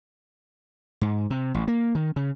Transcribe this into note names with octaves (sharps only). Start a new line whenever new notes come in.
G#2
C3
A1
A#3
D#3
C#3